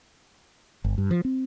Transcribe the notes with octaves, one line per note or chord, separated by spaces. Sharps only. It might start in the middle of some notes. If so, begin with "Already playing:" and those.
G1
G2
F3
C4